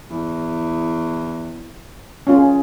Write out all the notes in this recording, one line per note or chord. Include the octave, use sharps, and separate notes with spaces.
E2
C#4 F4 G#4